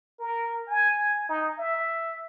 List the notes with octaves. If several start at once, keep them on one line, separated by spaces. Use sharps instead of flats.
A#4
G#5
D#4
E5